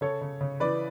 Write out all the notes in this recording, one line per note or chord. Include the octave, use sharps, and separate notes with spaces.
C#3 A4 C#5
C#3
C#3
E3 B4 D5